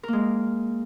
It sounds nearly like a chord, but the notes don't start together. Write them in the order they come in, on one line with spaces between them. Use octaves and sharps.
A#4 A#3 G#3